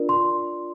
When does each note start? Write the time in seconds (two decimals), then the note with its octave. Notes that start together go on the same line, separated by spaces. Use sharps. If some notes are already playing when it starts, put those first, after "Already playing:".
Already playing: D4 F4 A#4 D5
0.09 C6